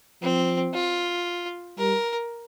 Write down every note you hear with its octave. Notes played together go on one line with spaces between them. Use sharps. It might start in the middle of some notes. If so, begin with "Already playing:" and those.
F3 C4
F4
G3 A#4